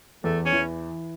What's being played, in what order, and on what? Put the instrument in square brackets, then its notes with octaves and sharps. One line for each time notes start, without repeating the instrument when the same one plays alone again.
[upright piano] E2 [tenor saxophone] A3
[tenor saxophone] C#4
[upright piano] E3